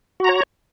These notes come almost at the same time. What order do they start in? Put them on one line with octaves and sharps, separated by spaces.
F#4 A#5 C#5